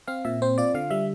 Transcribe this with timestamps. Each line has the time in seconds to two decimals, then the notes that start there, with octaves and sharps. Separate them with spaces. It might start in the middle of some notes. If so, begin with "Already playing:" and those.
0.08 C4 F5
0.25 A#2 E5
0.42 C4 C5
0.58 F4 D5
0.74 D3 F5
0.90 G3 E5